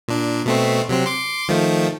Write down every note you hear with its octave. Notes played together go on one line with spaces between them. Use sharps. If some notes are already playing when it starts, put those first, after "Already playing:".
A#2 D4
B2 A3 C4
C3 F#3 C4
C6 D6
D#3 F3 A3